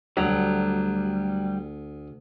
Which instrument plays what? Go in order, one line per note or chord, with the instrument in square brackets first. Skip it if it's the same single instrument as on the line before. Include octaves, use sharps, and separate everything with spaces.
[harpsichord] D2 [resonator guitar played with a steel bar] F#3 [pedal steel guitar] G3 [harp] A3